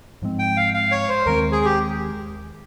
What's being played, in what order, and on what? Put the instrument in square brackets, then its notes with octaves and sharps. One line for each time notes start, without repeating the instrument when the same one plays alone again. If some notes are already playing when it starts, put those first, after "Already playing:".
[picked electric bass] G#2 F3 G#3 C4
[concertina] G5
F5
F5
C#5
C5
[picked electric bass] D#2 D#3 G#3 C4 [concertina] A#4
[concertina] G#4
G4